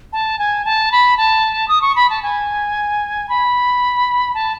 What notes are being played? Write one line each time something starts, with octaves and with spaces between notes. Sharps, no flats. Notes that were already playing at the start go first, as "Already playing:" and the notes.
A5
G#5
A5
B5
A5
D#6
C#6
B5
A5
G#5
B5
A5